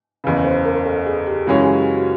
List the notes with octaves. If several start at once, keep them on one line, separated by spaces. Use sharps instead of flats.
F#1 E2 C#3 B4
C5
A#4
A4
G#4
G4
F#2 C#3 E3 G#3 C#4 F#4
G4
F#4